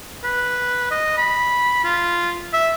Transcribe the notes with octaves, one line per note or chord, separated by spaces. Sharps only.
B4
D#5
B5
F4
E5